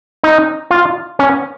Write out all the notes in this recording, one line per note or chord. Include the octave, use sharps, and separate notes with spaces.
D#4
F4
C#4